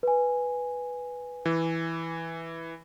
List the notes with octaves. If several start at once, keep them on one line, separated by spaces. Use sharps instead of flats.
B4 G#5
E3